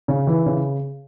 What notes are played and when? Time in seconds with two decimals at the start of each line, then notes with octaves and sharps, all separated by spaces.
0.08 C#3
0.27 E3
0.46 C#3